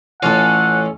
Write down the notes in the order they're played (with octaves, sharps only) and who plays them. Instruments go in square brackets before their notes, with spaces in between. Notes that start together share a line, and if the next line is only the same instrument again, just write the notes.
[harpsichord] A1 F4 [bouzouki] C#4 A4 [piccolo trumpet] F#5